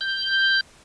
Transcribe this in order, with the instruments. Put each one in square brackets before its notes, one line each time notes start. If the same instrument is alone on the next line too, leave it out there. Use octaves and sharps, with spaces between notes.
[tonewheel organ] G6